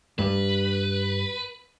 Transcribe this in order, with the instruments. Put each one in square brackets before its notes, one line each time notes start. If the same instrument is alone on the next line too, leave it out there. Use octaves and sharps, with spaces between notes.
[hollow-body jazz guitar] G2 G3 [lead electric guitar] B4